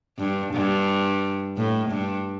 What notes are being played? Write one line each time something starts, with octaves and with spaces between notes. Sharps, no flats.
G2
G2
A2
G2